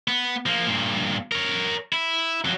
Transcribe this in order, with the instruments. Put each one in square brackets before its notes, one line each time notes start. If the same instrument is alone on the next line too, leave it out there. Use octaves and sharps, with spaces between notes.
[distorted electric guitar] B3
F3 A#3
G2 A#2
A#4 C#5
E4
F2 F#3